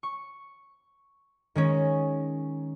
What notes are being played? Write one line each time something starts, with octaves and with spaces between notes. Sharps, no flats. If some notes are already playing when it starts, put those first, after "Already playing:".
C#6
D#3 G#3 C#4